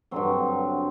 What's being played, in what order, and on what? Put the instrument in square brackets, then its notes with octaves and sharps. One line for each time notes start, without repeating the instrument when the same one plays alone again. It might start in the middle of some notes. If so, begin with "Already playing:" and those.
[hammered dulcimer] G2 D3 F#3 C4